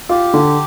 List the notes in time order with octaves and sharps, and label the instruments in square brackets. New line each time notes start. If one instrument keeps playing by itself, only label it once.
[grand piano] F4 [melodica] G4
[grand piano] D3